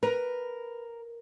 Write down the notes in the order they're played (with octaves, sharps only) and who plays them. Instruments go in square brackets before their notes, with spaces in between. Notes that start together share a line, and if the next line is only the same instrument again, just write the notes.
[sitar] A#4 [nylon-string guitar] B4